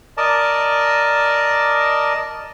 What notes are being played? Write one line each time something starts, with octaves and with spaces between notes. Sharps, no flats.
A#4 D5 D#5 A5